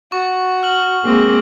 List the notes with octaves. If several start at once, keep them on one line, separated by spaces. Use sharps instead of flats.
F#4 C#6
F6 F#7
G#3 A#3 C4